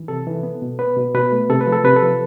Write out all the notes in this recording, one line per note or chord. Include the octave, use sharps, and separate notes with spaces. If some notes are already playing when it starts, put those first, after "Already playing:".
Already playing: E3
C3 A4
E3
B3
B2
B3 B4
B2
B2 B4
A3
C3 A4
B4
F3
A4
C3 B4
A4
F3